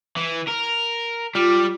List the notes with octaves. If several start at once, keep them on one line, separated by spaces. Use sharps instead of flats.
E3
A#4
G3 F4 D6